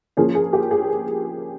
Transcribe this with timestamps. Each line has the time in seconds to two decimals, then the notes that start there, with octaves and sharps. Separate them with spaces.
0.17 F3 A#3 C#4 G#4
0.35 G#4
0.53 G4
0.71 G#4